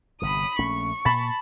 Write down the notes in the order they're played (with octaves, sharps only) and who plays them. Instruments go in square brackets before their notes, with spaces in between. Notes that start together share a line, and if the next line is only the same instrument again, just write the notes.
[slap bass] G1 C3 [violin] B5 D#6
[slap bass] A#1 A3 C#4 [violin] C#6
[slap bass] A#2 [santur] A5 B5